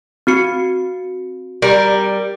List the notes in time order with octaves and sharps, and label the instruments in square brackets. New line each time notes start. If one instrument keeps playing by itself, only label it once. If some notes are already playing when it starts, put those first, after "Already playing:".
[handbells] C4 F#4 C#7
[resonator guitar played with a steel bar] G3 A#4